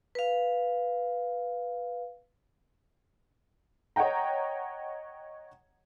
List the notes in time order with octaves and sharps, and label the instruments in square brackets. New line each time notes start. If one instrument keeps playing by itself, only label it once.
[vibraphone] B4 F5
[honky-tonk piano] C#5 D#5 F#5 G5 A#5